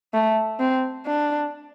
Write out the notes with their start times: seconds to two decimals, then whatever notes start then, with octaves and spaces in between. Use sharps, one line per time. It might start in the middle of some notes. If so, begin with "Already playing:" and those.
0.13 A3
0.59 C4
1.07 D4